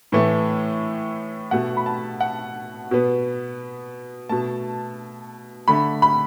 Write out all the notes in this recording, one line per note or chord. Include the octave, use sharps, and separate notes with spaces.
A2 E3 A3
B2 A3 F#5
B5
A5
F#5
B2 B3
B2 A3 A5
D3 A3 B5
B5